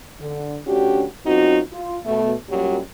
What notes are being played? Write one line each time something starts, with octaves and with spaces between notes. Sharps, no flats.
D3
D2 C#4 D4 F#4 G4
F#2 C4 D#4 F4 F#4
F4
B2 A3
F#2 A#2 F#3 G3